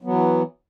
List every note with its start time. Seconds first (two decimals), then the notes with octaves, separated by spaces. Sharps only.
0.02 F#3
0.04 B3
0.07 E3